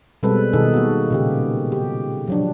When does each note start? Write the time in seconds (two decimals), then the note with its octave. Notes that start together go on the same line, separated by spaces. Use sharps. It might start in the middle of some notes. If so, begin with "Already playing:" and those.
0.23 B2 G3 G#3 C4 A4 B4
0.53 B2 D#3 D#4 G#4 A4
0.73 A#3 F#4
1.10 A#2 C#3 G4
1.72 G4
2.28 F3 F#3 D4